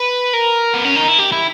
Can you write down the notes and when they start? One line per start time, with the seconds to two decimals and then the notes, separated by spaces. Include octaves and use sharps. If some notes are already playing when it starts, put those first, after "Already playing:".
Already playing: B4
0.33 A#4
0.74 B3
0.85 C#4
0.96 D#4
1.08 E4
1.19 G4
1.32 E4